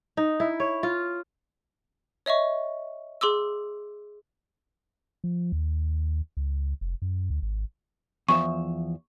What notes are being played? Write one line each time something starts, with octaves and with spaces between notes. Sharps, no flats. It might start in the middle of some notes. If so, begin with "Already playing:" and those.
D#4
E4
C#5
F4
C#5 D#5 E5 C#6
G#4 C6 D6 E6
F3
D#2
C#2
F1
F#2
D2
G#1
E2 F3 E5 C#6